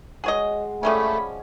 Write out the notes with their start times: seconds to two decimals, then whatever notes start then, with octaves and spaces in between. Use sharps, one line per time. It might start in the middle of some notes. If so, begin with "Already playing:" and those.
0.24 G#3 F#4 G#4 C#5 D#5
0.83 F3 G3 A3 C#4 B5